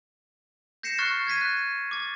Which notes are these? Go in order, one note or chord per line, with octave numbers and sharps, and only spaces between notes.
G6 A#6 C7 C#7 E7
C#6 F6 F#6 A6 C7
G#6 A6 B6 D#7
F#6
D6 A6